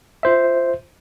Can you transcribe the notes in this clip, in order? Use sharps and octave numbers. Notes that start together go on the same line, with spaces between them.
F4 C5 E5